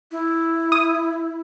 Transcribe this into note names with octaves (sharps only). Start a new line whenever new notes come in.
E4
D#6